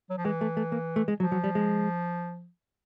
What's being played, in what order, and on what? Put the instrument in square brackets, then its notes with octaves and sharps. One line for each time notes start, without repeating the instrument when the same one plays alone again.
[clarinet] F#3
F3
[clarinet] E3 [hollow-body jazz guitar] G#3
[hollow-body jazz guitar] A3
A3
A#3
A3
G#3
[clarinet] F3 [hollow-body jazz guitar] F#3
[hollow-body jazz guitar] F#3
G3
G#3